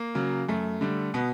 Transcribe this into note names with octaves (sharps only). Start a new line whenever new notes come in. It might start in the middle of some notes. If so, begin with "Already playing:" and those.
Already playing: A#3
C#3 F#3
F#2 A3
D3 G3
B2 B3